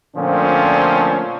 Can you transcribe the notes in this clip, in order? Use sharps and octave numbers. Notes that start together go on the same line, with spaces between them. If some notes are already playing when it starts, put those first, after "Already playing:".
A#2 D3 F3 A3 C4 C#4